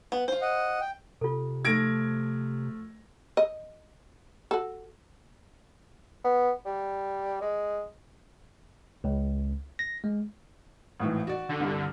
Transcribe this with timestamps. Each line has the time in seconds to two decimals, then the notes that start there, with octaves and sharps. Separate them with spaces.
0.12 B3
0.28 F4 C5
0.41 D#5 F#5
0.81 G5
1.21 C3 F4 A4
1.65 F3 A3 G#6 A#6 D7
3.37 D#5
4.51 F#4 A4
6.24 B3
6.66 G3
7.41 G#3
9.04 C#2
9.79 A#6
10.04 G#3
11.00 G#1 A2 E3
11.27 F#4 D5
11.49 D3
11.60 C2 G2